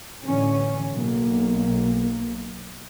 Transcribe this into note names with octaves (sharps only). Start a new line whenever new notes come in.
A1 D3 E3 C#4
B1 A#3